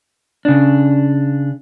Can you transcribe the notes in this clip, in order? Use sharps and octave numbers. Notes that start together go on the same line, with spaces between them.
C#3 D4